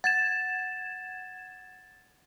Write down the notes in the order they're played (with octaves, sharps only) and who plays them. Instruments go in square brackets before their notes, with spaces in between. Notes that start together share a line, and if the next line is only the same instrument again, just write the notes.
[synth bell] F#5 G#6 E7 [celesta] A6